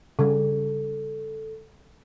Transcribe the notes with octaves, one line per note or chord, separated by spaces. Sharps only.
C#3 G3 A4